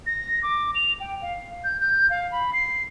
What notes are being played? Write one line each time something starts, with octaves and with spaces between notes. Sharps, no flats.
A#6
D6
F7
G5
F5
G6
G6
F5
B5
C7